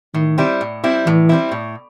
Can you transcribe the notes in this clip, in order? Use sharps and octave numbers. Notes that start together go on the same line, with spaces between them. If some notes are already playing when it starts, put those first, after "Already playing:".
A2 D#3
G3 C4 E4
A2
G3 C4 E4
A2 E3
G3 C4 E4
A2